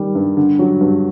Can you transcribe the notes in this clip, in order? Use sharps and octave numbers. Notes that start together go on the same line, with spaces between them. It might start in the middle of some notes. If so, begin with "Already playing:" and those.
Already playing: D#3 G3
G2
D3
F#3
G2